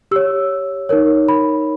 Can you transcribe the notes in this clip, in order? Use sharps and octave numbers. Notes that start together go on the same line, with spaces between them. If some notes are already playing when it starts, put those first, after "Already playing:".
G4 C#5 E6
D#4 A#4 C#5
B5